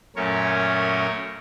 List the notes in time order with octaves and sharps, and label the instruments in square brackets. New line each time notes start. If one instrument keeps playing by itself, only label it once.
[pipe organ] F#2 A#2 A3 C#4 A#4 C#5